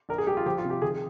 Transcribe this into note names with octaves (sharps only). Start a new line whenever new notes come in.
A#1 A#4
G#4
G3 G4
F4
F3 G4
F4
C3
G4
D#3 G#4